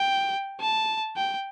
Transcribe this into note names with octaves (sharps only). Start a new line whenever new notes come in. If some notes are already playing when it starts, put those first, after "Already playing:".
Already playing: G5
A5
G5